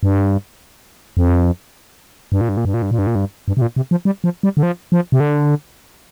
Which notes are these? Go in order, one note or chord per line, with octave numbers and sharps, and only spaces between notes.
G2
F2
G2
A#2
G2
A#2
G2
A#2
G2
A#2
G2
A#2
G2
G2
C3
A#2
C3
F3
G3
F3
G3
D3
F3
F3
C3
D3